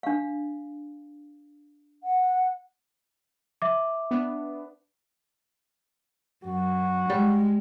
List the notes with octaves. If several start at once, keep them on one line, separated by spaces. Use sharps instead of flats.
D4 F5
F#5
E5 D6
B3 D4
F#2 F#4
G3 G#3